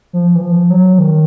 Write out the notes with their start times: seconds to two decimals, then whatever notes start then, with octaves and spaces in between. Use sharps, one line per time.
0.13 F3
0.35 E3
0.42 F3
0.70 F#3
0.99 D#3